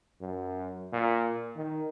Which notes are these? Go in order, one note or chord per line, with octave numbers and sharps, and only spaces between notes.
F#2
A#2
D#3